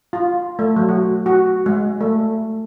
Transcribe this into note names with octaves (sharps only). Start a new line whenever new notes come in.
F4
A3
F#3
F#4
F#4
G#3
A3